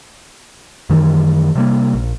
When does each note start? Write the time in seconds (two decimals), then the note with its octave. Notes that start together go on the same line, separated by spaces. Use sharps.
0.90 F#2 D#3 E3 G3
1.55 C3 G3 A#3
1.94 A#1